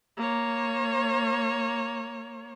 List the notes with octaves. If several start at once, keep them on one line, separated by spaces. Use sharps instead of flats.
A#3 C#5